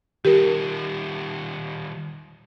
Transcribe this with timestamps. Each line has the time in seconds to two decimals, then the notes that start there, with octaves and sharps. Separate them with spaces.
0.25 D#3 G3 G4 A#4